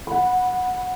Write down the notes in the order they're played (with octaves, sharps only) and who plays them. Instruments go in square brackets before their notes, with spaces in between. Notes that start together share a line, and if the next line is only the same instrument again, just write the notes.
[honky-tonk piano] F#5 B5